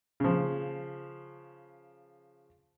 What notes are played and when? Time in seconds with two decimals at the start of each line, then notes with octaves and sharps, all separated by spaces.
0.20 C#3 F3